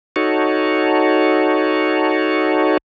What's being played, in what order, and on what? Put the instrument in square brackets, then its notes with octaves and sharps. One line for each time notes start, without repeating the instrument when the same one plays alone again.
[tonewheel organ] D#4 F#4 A4 C#5